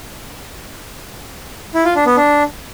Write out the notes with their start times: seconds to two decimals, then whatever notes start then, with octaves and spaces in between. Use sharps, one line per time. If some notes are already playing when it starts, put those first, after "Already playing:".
1.74 E4
1.85 F4
1.96 D4
2.06 B3
2.17 D4